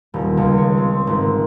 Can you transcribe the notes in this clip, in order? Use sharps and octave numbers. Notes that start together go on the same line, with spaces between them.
D#1
C#2
C#5
C4
G#1